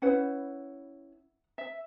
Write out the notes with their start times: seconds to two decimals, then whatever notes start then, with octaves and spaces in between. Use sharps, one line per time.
0.02 C#4 E4 B4 F#5
1.58 E5